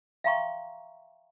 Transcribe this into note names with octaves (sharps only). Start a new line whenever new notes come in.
E5 F5 G5 A#5 C6 C#6